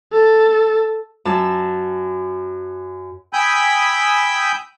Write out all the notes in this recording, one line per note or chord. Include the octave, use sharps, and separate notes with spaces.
A4
F#2 A5 E6
G5 G#5 B5 D#6 E6 G6